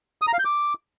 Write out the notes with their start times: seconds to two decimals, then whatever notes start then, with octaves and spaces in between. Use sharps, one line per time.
0.22 D#6
0.27 A#5
0.33 F5
0.39 G6
0.45 D6